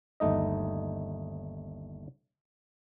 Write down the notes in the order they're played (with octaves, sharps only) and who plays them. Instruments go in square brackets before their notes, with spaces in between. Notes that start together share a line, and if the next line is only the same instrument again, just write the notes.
[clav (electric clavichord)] G1 D#2 A3 D#4 D#5